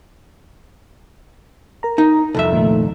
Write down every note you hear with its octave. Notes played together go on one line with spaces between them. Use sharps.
A#4 A#5
D#4
C2 F2 A4 E5
A#2 D#3 A3